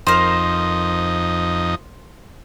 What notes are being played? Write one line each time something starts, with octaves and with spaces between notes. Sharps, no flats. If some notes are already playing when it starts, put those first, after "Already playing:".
F2 D#4 A#4 C5